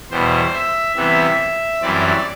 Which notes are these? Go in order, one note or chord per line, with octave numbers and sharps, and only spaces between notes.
E2 B2 G3 C5
E5
C3 E3 G3 B3 E5
F#2 E3 G3 C4 D5